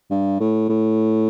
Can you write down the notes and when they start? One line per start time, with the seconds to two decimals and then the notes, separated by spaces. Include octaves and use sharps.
0.10 G2
0.40 A2
0.69 A2